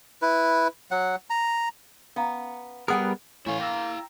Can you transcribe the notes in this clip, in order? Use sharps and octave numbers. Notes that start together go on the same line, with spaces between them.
E4 B4
F#3 F#5
A#5
B3 C#4 F5 A#5
G3 B3 G#4 A#4 F#5 G5
A2 E3 A3 C#4 E4 F5
A#3 G5 A#5 E6